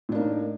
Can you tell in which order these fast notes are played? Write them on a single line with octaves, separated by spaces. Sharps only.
A2 D4 A#3 D#4